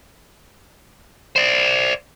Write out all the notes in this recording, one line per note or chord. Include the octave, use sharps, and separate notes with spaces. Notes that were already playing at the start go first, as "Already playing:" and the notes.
C5 D5